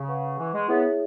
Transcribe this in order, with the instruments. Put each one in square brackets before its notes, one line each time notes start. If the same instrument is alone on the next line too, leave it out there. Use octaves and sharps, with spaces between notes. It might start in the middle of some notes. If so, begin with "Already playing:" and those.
Already playing: [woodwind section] C#3
[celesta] B4 F#5 C#6
[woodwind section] E3
G#3
[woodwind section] B3 [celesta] E4 G#4 C#5 E5